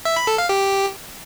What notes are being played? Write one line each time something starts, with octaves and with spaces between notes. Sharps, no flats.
E5
B5
A4
F5
G4